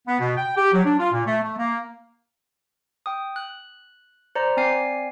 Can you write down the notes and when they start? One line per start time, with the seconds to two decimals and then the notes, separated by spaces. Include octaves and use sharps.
0.08 B3
0.20 B2
0.37 G5
0.57 G4
0.73 F#3
0.85 D4
0.98 F4
1.12 A#2
1.26 A3
1.42 A3
1.58 A#3
3.06 G5 D#6
3.36 F#6
4.35 C5 D5 A#5
4.57 C4 D5 G#5 C7